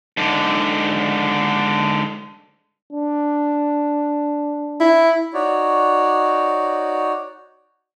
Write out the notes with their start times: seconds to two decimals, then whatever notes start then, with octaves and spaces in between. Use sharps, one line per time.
0.17 G#2 D3
2.93 D4
4.80 E4
5.34 D#4 F#4 C#5 D5